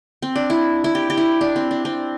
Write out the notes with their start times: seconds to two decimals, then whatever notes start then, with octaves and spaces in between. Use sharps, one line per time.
0.22 C4
0.36 D4
0.50 E4
0.84 E4
0.95 G4
1.10 G4
1.17 E4
1.41 D4
1.56 C4
1.71 D4
1.85 C4